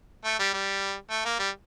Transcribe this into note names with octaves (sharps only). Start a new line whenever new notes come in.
A3
G3
G3
A3
A#3
G3